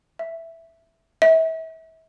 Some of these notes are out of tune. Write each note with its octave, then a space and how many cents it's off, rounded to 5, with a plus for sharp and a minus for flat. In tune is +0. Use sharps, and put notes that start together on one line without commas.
E5 +0
E5 -30